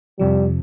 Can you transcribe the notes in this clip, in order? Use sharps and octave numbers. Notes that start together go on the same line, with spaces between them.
F2 C3 F3 G3